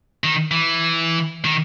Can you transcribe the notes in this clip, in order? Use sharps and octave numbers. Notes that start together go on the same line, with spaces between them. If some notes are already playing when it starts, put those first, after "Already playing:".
D#3
E3
D#3